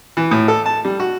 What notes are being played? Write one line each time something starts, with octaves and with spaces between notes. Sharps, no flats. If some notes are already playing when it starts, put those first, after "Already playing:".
E3
A2
A4
A5
G3
F#4